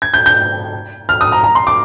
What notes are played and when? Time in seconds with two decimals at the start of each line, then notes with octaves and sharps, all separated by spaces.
0.02 G#6
0.14 G6
0.26 G6
1.09 F6
1.21 D#6
1.32 A#5
1.44 A#5
1.55 C6
1.67 D6